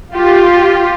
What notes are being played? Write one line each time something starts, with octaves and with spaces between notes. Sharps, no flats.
F4 G4